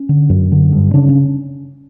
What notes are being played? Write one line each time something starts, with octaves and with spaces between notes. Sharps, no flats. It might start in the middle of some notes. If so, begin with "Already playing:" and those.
Already playing: C#4
D3
F#2
D3
G2
C#3 D4
C#4